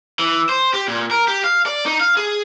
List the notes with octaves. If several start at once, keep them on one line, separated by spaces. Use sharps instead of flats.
E3
C5
G4
A#2
A#4
G4
F5
D5
D#4
F5
G#4